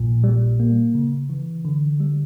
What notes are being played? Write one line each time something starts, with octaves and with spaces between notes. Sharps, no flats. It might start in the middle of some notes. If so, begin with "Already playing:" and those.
Already playing: A#1 A#2
G3
A#3
C#3
E3
D3
G3